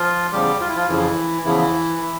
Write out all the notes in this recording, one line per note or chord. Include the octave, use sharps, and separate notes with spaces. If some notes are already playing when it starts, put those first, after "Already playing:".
Already playing: F3 F4
E2 C#3 F3 G3 G4
F4
E4
F3 F4
F2 C#3 E3 F3 E4
E2 C#3 E3 F3 E4
E3